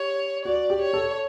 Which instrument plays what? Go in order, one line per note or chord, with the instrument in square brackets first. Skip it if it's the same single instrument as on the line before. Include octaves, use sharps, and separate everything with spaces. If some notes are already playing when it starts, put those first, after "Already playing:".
Already playing: [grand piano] G4 [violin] C#5
[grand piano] F#4 [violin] D5
[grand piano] G4
[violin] C#5
[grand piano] A4